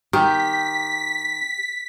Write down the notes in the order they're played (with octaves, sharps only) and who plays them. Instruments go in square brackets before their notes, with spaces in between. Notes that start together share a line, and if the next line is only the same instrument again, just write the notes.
[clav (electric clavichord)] D#3 [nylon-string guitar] G4 [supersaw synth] B6